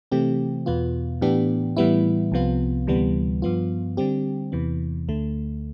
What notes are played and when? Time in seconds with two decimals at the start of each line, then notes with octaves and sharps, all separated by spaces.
0.12 C3 E3 A3 C4 G4
0.66 E2 B2 B3 F4
1.21 A2 E3 B3 D4 G4
1.77 A2 E3 G3 B3 E4
2.32 C2 C3 F3 B3 F4
2.87 D2 C3 E3 G3 B3
3.42 G2 F3 B3 F4
3.97 D3 G3 C4 G4
4.52 E2 C3 E3 B3
5.08 D2 D3 A3